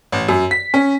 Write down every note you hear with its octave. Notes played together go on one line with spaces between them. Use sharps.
A1
F#2
B6
C#4